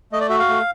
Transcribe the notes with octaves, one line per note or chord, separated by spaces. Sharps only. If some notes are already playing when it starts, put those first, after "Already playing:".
A3 D#5
D5
F#4 E5
F5
A3